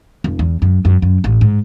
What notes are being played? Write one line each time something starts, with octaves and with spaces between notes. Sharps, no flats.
F1
E2
F#2
F#2
F#2
A1
G#2